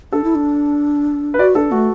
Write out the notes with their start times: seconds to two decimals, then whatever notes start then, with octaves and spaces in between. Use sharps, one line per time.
0.12 D4 A4
0.24 E4
0.35 D4
1.34 B4
1.39 F#4 D5
1.55 D4 A4
1.71 A3 F#4